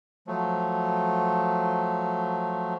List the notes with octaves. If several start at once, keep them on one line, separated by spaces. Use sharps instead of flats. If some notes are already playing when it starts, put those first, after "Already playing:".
F3 F#3 A3